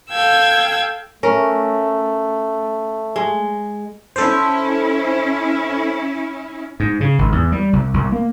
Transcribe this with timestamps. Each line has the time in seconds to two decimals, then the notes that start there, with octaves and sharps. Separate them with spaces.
0.11 A4 F5 G5 E6 G#6
1.23 A3 C#4 A#4
3.16 G#3
4.16 C#4 E4 A4 C5
6.80 G#2
7.01 C#3
7.19 G#1
7.32 E2
7.52 G3
7.73 C2
7.94 C2
8.12 A#3